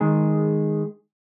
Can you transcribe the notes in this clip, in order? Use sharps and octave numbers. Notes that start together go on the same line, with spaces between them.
D#3 G#3 G#4